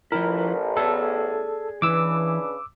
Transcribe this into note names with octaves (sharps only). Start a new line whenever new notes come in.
A1 F3 E4 A#4
G#4 A4 D5
C#3 E3 D4 E4 B4 D6 E6